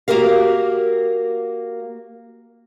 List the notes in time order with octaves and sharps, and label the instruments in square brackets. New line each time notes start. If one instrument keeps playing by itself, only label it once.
[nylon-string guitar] A#3 F#4 G4 A#4 F5